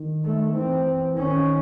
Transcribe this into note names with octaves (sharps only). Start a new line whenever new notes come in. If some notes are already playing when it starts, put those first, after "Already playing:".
Already playing: D#3
A3
E3 C4
D#3 C#4